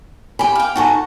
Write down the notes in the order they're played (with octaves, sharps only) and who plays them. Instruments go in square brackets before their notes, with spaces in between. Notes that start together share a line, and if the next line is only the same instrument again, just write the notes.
[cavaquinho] G4 B5 [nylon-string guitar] G#5
[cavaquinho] F5 G5
[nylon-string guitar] D#4 G5 G#5 [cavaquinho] F#4 A4 C#6